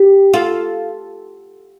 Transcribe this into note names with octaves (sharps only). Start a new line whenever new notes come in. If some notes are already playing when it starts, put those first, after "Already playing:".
Already playing: G4
F4 A4